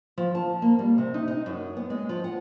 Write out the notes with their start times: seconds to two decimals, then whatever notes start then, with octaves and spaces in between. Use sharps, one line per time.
0.18 F3
0.35 A5
0.62 A#3
0.79 G3
0.98 C3
1.14 D#4
1.28 D#4
1.46 F#2
1.77 B3
1.90 G#3
2.09 F3
2.24 F#5